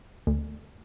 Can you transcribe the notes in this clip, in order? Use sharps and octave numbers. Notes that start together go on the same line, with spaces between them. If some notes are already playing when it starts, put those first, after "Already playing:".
D2